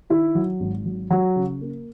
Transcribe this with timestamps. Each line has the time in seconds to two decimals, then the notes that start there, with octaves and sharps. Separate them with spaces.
0.10 D#3 E4
0.35 F#3
0.60 G#1
0.85 F#3
1.10 F#3 F#4
1.36 C#3
1.61 A#3